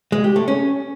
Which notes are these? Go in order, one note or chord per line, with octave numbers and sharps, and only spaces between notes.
G#3
G4
A3
C#4